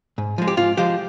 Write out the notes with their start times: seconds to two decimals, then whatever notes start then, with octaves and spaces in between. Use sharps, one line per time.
0.18 G#2
0.38 F3 G#3
0.47 G4
0.57 G#2 F4
0.77 F3 G#3 G4